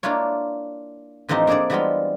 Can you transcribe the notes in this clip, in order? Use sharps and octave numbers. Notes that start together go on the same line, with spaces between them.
A#3 D4 E4 F4 C#5
A2 E3 F3 C4 D#4 G4
A#3 D4 G#4 A4 D5
E3 G3 G#3 B3 C4 F4